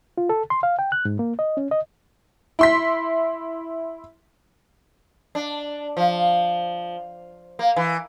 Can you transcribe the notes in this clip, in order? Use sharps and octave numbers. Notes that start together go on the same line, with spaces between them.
F4
A4
C6
F5
G5
F#6
G#2
A#3
D#5
C#4
D#5
E4 C6 B6
D4
F3
A#3
E3